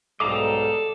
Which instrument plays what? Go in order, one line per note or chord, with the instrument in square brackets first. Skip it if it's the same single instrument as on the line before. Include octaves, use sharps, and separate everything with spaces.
[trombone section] B1 G#2 G3 [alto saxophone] A4 [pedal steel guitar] D#5 F5 A#5 [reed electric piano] D6